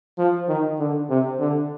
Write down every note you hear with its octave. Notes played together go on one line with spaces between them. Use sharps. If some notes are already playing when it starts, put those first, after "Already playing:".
F3
D#3
D3
C3
D3